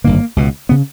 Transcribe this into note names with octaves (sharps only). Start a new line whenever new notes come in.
G#1 G2 D3 A#3
C#2 B2
C#3 B3